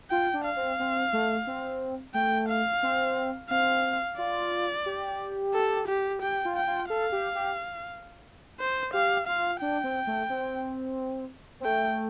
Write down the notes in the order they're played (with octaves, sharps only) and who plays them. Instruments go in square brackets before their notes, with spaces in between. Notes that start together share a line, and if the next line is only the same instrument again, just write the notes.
[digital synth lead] F4 [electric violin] G5
[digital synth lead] D4
[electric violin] F5
[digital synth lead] C4
C4
A3
C4
[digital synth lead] A3 [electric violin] G5
[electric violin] F5
[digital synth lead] C4
[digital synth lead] C4 [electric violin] F5
[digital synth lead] F4 [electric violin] D5
[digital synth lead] G4
[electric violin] A4
G4
[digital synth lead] G4 [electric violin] G5
[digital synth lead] F4
[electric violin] G5
[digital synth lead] F4
[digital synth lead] A4 [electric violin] F5
[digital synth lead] G4
G4
[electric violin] C5
[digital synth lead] G4 [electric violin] F5
[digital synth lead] F4 [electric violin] F5
[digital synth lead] D4 [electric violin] G5
[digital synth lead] C4
A3
C4
C4
[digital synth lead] A3 [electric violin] G5